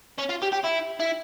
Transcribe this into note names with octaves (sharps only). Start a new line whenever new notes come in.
C#4
F4
G4
G4
E4
E4